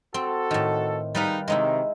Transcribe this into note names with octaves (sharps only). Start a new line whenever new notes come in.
C4 F#4 A4
A2 D#3
G#2 G3 D#4 B4 F5
C3 D#3 G#3 D#4 E4